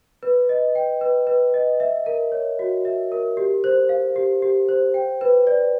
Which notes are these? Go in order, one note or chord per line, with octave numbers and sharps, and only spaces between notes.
B4
D#5
G5
B4
B4
D#5
E5
A#4
C#5
F#4
E5
A#4
G4
C5
F5
G4
G4
C5
G5
B4
D5